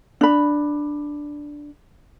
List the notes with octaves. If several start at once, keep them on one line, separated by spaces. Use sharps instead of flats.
D4 B5